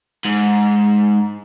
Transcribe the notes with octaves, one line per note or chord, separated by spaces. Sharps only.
G#2